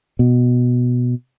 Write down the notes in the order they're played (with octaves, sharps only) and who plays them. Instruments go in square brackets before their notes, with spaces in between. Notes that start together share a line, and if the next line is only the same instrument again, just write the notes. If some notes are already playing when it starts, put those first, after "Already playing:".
[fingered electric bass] B2